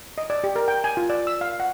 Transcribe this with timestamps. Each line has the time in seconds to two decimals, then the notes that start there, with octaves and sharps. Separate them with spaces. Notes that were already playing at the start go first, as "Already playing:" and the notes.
0.18 D#5
0.30 D5
0.44 G4
0.56 A#4
0.68 G5
0.84 G#5
0.97 F4
1.10 D5
1.27 E6
1.41 F5
1.60 F#5